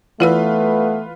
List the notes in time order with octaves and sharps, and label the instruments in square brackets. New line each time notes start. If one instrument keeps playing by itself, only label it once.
[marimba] E3 E4 E6 [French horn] A3 [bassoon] B3 [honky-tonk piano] F4 B4